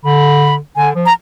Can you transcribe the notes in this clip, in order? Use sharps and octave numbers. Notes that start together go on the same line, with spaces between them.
D3 B5
D3 G#5
F3
A#5